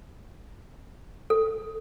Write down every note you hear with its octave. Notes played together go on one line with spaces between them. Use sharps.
A4